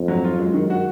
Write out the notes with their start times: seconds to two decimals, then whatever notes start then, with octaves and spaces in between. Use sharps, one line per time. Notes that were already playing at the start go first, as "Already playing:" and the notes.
Already playing: F2
0.08 F#3
0.24 F4
0.38 F#2 G#3
0.54 D#3
0.70 F#4